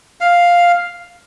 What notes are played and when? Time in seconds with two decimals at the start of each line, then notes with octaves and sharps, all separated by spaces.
0.21 F5